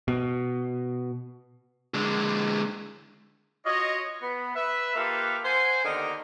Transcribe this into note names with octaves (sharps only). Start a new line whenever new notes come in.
B2
D3 G#3
F4 F#4 C#5 D#5
B3
B4 E5
A#3 F4 G4 A4 B4 E5
C5 F#5 G#5
D3 D#3 A#3 B3 D#4 G4